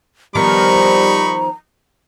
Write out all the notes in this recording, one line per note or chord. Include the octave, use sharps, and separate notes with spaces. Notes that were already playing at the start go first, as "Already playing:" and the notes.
D#3 F3 G3 B3 D#4 A#5 B5 C#6